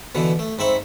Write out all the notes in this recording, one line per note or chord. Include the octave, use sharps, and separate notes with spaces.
B2 D3 E3
A3
G#2 C4 E5 B5 C#6